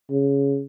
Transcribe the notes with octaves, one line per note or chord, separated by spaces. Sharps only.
C#3